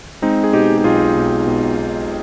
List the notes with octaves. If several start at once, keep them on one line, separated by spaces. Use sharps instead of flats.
G#3 C4 D#4
G#4
B2 D#4 G4
G4
B1 F4 G#4
B1
B2
B2